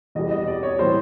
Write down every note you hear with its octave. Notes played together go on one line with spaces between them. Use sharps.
E2 B2 G3 D#5
D#5
D5
C#5
A2 E3 G3 C5